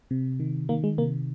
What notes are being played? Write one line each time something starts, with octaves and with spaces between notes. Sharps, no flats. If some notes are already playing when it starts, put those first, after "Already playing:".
C3
D#3
D#3 A#3
G#3
C3 A#3